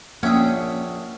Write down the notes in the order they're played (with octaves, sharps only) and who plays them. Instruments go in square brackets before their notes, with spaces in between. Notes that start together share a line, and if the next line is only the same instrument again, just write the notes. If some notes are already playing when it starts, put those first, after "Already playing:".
[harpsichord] A#1 E5 G5 [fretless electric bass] A#3 [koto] C#4 [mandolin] F#5 D#6